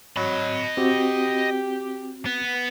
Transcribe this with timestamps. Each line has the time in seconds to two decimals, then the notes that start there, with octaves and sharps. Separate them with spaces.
0.16 F#3 D#5 B5
0.77 C4 F#4 G4
2.26 B3